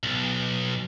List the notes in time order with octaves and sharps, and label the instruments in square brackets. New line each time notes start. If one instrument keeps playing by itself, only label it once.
[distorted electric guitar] B1